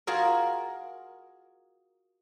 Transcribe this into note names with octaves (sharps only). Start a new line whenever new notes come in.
F4 F#4 G#4 A#4